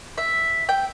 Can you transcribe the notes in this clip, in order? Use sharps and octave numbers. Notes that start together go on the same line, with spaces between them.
E5
G5